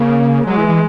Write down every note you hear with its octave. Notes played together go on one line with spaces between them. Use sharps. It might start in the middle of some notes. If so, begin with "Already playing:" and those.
Already playing: C#3 A#3
F#3 G#3
E3
E3